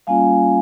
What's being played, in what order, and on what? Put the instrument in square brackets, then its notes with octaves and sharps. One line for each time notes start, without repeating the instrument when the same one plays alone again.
[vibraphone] G3 A#3 C#4 F4 F5 G#5